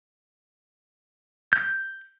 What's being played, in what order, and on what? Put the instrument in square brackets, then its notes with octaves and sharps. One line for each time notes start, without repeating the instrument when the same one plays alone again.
[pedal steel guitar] G6